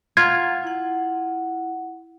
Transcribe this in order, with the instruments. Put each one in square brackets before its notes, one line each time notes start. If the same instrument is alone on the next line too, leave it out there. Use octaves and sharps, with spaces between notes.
[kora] F4 [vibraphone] F5 F#5 A#5 [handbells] G#6
[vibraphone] E4 F#5